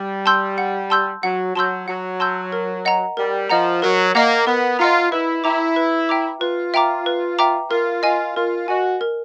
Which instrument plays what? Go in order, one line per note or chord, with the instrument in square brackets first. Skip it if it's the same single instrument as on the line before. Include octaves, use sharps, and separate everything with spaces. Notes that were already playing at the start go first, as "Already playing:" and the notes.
Already playing: [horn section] G3
[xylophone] A5 C6 E6 G6
F#5
A5 C6 E6 G6
[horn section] F#3 [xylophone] F#5
[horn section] F#3 [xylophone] A5 C6 E6 G6
[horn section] F#3 [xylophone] F#5
[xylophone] A5 C6 E6 G6
A#4
D#5 F#5 A#5
[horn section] G3 [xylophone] A#4
[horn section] F3 [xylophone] D#5 F#5 A#5
[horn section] F#3 [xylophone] A#4
[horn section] A#3 [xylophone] D#5 F#5 A#5
[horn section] B3 [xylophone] A#4
[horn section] F4 [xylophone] D#5 F#5 A#5
[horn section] E4 [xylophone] B4
[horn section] E4 [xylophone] E5 G5 A#5 D6
[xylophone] B4
E5 G5 A#5 D6
[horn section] F4 [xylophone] B4
[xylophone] E5 G5 A#5 D6
B4
E5 G5 A#5 D6
[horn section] F4 [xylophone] A#4
[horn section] F4 [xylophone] D#5 G#5
[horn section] F4 [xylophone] A#4
[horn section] F#4 [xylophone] D#5 G#5
[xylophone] A#4